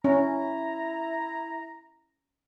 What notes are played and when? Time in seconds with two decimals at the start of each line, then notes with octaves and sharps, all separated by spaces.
0.04 C#4 E4 A#5